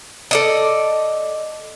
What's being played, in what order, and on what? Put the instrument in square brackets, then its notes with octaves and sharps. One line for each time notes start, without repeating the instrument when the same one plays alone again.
[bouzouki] A4 D5 D#5